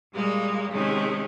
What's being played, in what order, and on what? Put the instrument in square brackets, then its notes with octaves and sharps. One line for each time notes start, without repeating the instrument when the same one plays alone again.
[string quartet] A#2 G3 G#3 A#3
C3 D#3 G#3 A3 C#4